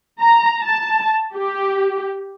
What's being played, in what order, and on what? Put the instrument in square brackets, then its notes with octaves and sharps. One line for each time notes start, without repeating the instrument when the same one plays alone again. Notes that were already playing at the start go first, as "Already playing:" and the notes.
[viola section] A#5
A5
G4